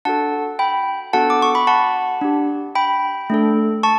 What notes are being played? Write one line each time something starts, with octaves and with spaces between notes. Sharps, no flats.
D4 F#4 A4 F#5 A5
G5 B5
B3 D4 F#4 A4 F#5 A5
D6
C#6
B5
F#5 A5
D4 G4
G5 B5
A3 D4 A4
A5 C#6